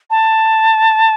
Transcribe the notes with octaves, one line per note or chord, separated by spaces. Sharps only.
A5